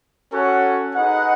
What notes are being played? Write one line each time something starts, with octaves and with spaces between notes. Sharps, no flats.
C#4 F#4 A4 C#5 F#5
D#4 G#4 B4 D#5 F#5